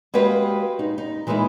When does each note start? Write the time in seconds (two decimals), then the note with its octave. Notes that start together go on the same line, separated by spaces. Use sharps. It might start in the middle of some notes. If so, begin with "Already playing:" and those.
0.14 G#3 F#4 G4 B4 F5 G5
0.79 D#4
0.98 D#4
1.27 E3 G#3 A#3 D#4 E4